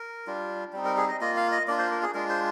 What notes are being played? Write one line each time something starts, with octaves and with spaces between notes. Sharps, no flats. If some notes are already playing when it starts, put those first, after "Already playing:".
Already playing: A#4
G3 D4 F4
G3 C4 D#4
A#4
G#4
D#5
A#3 F4 D#5
F5
D#5
A#3 D4 F4 D5
C5
A#4
G#4
G#3 D4 F4 A#4
C5